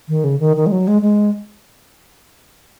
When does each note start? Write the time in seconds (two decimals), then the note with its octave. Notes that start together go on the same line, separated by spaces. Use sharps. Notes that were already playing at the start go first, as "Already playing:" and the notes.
0.08 D#3
0.24 C#3
0.40 D#3
0.56 D#3
0.67 G#3
0.72 F#3
0.88 G#3
1.02 G#3